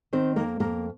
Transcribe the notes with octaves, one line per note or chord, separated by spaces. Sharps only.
D#3 C4 C5
F2 A#3 A#4
F2 A#3 A#4